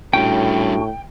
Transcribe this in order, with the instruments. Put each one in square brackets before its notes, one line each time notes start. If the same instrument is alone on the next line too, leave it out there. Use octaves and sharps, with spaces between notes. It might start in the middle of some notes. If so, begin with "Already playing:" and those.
[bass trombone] A2 [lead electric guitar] G3 C#4 [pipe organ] D4 F#4 [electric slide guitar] G5